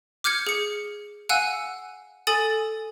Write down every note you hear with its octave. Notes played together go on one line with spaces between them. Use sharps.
D6 F6 G6 G#6 C#7
G#4 C#7
F5 F#5 G#5 E6 F#6 D#7
A4 G#5 D#6 A6